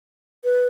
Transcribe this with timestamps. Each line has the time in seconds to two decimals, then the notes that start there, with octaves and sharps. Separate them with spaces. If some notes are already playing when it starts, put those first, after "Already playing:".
0.44 B4